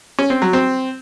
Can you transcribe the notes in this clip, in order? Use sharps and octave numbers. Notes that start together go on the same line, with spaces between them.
C#4
C4
F#3
C4